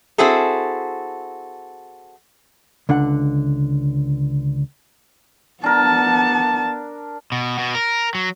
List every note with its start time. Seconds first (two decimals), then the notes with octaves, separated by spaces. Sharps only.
0.18 C4 E4 F#4 G#4 A4
2.89 C#2 D3 D4 F#5
5.64 B3 D4 A#4 A5
7.32 B2
7.59 B2
7.75 A#4
8.15 F#3